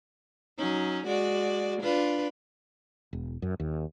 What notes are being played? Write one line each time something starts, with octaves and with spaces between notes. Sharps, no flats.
F#3 C#4 D#4
G#3 F#4 D5
D4 F4 B4
E1
F#2
D#2